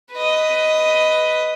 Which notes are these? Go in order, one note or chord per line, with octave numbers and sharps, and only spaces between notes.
B4 D#5